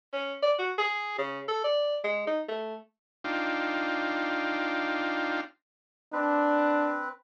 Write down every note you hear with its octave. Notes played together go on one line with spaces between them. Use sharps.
C#4
D5
F#4
G#4
C#3
A4
D5
G#3
D#4
A3
D4 D#4 F4 F5 G5
C4 D4 B4